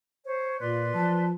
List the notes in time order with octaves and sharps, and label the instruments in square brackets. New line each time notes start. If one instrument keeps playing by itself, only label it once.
[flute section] C5 C#5
[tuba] A#2 [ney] F4 [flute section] B4 D5 C6
[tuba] F3 [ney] A5